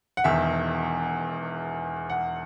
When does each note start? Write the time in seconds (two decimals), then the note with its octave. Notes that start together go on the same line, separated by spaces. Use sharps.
0.17 F#5
0.24 E1 E2 D#3 E5
2.10 F#5